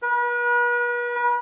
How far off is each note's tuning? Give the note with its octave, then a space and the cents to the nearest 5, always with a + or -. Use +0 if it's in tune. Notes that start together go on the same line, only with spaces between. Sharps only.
B4 -40